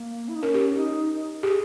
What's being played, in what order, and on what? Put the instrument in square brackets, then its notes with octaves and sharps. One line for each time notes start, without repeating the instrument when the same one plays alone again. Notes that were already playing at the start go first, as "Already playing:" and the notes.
Already playing: [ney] A#3
E4
D#4
[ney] C#4 [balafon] A#4
[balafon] G4
[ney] D#4
[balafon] G4 [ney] G#4